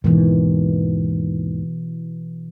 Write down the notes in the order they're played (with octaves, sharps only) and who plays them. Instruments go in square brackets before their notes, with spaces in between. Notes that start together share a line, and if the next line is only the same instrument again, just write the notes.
[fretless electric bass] D#2 G#2 D#3 [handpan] B2 E3